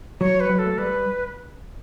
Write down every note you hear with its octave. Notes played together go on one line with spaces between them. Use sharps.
F#3 C#5
B4
F#3
A4
A3
G3 B4